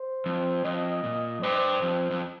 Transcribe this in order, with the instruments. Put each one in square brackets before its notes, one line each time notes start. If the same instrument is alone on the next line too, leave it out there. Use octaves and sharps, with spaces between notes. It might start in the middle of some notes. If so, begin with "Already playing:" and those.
Already playing: [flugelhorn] C5
[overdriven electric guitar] F2
[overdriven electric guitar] F2 [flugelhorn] D#5
[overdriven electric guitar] A#2
F2
[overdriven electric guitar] G2 [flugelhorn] C5
[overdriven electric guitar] F2
F2